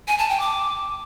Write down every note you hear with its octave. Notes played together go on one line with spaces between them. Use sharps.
G#5
A5
G5
D6